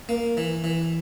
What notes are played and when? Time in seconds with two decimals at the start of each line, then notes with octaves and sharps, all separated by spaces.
0.09 A#3
0.37 E3
0.64 E3